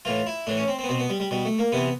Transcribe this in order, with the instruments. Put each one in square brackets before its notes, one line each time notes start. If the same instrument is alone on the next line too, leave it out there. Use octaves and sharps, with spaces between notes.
[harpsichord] A2 E3 F4
E4
A2 E3 D4
C#4
C4
C4
B3
B2 C4
B3
G3
G3
B2 G3
A3
A#3
C3 E3 B3